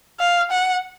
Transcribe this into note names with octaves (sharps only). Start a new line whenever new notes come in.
F5
F#5